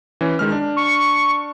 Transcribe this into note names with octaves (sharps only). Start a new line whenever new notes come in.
E3 C#4
D#3 G#3 F6
D4
C#6